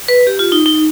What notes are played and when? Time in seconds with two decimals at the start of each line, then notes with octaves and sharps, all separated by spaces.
0.08 B4
0.27 G4
0.39 F4
0.52 D#4
0.66 D#4